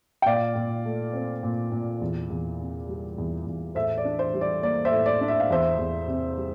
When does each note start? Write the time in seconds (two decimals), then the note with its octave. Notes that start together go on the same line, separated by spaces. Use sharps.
0.22 G5
0.26 A#2 D5 F5
0.55 A#2
0.85 A3
1.13 C4
1.43 A#2
1.72 A#2
2.01 E2
2.30 E2
2.60 C3
2.89 G3
3.18 E2
3.46 E2
3.75 A2 C5 E5
3.98 D5
4.05 D4
4.19 C5
4.34 G3
4.41 D5
4.63 A#3 D5
4.85 C5 E5
4.92 A2
5.06 D5
5.21 D4
5.28 E5
5.40 F5
5.50 E2 C5 E5
5.79 E2
6.08 C3
6.37 G3